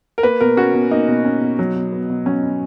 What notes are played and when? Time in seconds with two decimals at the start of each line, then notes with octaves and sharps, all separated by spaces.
0.18 A#4
0.23 A#3 B4
0.40 B2 A#4
0.57 C#4 F#4
0.74 B2
0.91 A#3 D#4
1.08 B2
1.25 C#4
1.41 B2
1.59 F#3
1.75 B2
1.92 B3
2.10 B2
2.26 F#3 C#4
2.43 B2